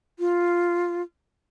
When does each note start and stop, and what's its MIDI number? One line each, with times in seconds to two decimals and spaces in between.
0.19 1.02 65